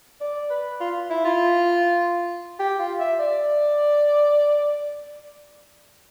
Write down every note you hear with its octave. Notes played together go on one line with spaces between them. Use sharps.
D5
B4
F4
E4
F4
G4
F4
E5
D5